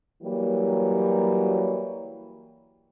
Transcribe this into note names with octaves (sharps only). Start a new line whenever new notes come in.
E3 F#3 G3 A#3